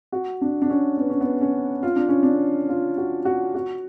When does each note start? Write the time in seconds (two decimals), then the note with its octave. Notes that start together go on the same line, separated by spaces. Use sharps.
0.12 F#4
0.41 D4
0.62 D4
0.70 C#4
0.97 B3
1.10 C#4
1.21 B3
1.41 C#4
1.83 F4
1.96 D4
2.09 C#4
2.23 D4
2.69 F4
2.97 F#4
3.25 F#4
3.55 F#4